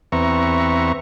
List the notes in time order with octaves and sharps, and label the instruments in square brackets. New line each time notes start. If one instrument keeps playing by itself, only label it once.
[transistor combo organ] E2 C4 B4 E5 A#5 C#6